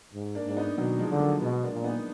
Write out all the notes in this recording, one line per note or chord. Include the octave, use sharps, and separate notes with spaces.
G#2
A#3 D4
G#2 D4
B3 D#4
B2 D#3 F#3
F3 G#3
D3
F#3 A#3
B2 G#3 B3
A#3 D4
A#2
B3 D#4